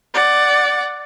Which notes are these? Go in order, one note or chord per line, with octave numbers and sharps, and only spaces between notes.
D5 F#5